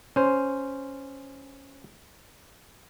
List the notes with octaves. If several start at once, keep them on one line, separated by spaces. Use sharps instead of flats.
C#4 C5